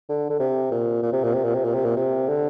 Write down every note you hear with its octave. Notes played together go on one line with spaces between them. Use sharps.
D3
D3
C3
A#2
A#2
C3
A#2
C3
A#2
C3
A#2
C3
A#2
C3
D3